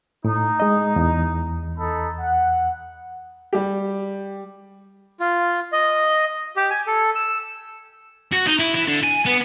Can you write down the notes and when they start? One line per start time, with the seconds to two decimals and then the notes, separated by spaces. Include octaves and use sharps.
0.25 A2 D#4
0.60 G#3 D#5
0.96 E2
1.78 D#4 A4 B5
2.20 F#5
3.53 G3 G4
5.20 F4
5.72 D#5
6.56 G4
6.70 G#5
6.87 A4
7.15 E6
8.32 F#4
8.47 D#4
8.59 E4
8.75 E3
8.88 D3
9.03 G#5
9.26 B3